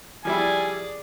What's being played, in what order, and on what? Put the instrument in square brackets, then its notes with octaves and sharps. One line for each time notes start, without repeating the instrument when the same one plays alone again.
[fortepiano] F3 G3 E4 [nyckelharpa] G#4 D5 [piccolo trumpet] G#5